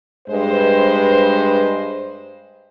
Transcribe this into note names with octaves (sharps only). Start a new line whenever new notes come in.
G2 G#3 B4 C5